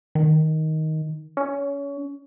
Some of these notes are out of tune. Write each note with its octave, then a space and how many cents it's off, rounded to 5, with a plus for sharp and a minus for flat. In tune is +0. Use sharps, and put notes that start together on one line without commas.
D#3 +10
C#4 +25